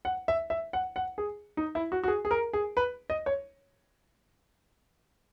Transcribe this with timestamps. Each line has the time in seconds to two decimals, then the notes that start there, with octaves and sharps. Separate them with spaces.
0.05 F#5
0.28 E5
0.50 E5
0.73 F#5
0.96 F#5
1.18 G#4
1.57 D#4
1.75 E4
1.92 F#4
2.04 F#4
2.08 G#4
2.25 G#4
2.31 A#4
2.53 G#4
2.77 B4
3.10 D#5
3.26 C#5